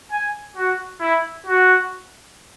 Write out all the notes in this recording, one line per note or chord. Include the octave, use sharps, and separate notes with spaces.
G#5
F#4
E4
F#4